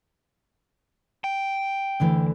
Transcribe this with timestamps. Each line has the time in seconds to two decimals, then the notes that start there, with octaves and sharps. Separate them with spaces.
1.24 G5
2.00 D2 D3 E3